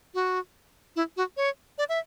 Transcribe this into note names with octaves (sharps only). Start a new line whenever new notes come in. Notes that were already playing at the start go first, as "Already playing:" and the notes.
F#4
E4
F#4
C#5
D5
E5